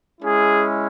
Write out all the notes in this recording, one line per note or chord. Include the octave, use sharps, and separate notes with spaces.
G#3 C#4 E4 G#4